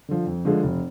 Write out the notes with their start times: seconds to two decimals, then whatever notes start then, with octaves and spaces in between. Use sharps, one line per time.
0.08 D3 F3
0.27 F2
0.45 D3 F3 G#3
0.63 F1